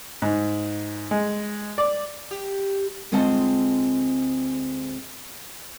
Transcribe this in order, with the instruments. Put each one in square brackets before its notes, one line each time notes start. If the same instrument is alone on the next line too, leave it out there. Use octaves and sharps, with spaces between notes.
[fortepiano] G#2
G#3
D5
[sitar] G4
[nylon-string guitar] D2 G#3 C4 F4 F#5 A5